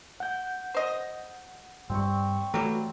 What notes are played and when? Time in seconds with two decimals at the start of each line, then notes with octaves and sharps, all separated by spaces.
0.20 F#5 G6
0.74 C5 D#5
1.89 G2 G3 C4 C#6
2.54 E3 F#3 G3 A3 F#4